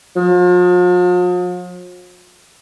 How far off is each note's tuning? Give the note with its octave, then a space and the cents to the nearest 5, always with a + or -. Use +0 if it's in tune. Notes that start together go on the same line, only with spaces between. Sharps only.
F3 +45